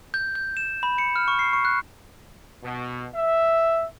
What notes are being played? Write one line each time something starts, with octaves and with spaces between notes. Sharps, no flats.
G6
G6
E7
B5
C#7
F6
C#6
C7
C#6
F#6
B2
E5